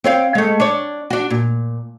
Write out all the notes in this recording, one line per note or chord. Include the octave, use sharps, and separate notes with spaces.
C4 C#5 F5
G#3 A3
D4 C#5
D4 F#4
A#2